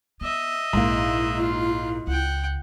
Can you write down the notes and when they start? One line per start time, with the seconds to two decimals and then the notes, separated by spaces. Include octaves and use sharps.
0.21 B3 D#5 E5
0.73 A#1 G#2 A#3 E4
1.41 F4
2.07 C#2 F#5 G5